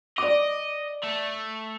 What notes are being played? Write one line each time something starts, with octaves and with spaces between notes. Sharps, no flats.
D5 D#5 D6
A3